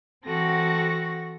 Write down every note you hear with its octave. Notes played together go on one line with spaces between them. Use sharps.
E3 C4 F#4 A4 F#5 A#6